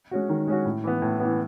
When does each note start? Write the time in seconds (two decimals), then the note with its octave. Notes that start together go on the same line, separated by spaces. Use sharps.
0.11 G#3 C#4 F#4
0.29 D#3
0.47 G#3 C#4 F#4
0.65 A2
0.84 E3 B3
1.02 A2
1.20 E3 B3